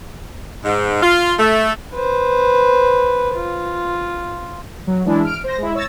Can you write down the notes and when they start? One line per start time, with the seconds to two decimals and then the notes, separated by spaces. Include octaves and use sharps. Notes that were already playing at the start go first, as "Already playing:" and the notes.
0.64 G#2
1.02 F4
1.39 A3
1.94 B4 C5
3.35 F4
4.87 F#3
5.05 E3 G#3 D4 E4
5.24 F6 D7
5.44 C5 A#6
5.58 G#3 E4
5.75 C#5 E6 A6 A#6